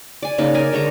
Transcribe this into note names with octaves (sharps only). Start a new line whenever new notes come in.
D5 G#5
C#3 A#3 D#4
A#4 D5 G#5
D3 G#3 C#5 A#5